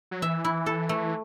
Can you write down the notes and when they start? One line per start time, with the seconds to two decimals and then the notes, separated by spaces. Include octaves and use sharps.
0.11 F#3
0.22 E3 E5
0.45 E4
0.66 A4
0.89 A3